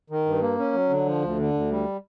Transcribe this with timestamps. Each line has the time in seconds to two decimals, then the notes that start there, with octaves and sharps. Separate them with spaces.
0.10 D#3
0.26 G2
0.41 A#3
0.58 C#4
0.73 F#3
0.89 D3
1.06 F3
1.22 D2
1.38 D3
1.53 D2
1.70 G3